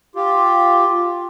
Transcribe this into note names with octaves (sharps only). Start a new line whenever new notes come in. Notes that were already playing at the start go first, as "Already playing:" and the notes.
F4 G4